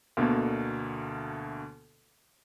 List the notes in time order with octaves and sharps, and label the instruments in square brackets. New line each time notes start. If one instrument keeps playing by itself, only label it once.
[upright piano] D2 B2 D3 A3 A#3